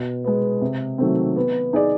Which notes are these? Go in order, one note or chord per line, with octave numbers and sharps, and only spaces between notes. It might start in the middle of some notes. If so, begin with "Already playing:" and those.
Already playing: B2
G#3 B3
C3
D#3 F#3 A3 C4
B3
D#4 G#4 B4 D5